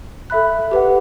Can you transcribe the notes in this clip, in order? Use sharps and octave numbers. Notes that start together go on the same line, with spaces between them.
A4 E5 B5 F#6
G4 B4 F#5